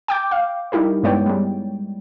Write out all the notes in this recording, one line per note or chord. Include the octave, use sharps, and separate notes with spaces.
G5 D6 G6
F5
G3 D#4 E4 G4 A#4
G2 G#3 B3 C#5 D5 G5
G3 G#3